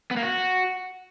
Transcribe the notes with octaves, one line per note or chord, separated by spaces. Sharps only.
B3
A#3
F#4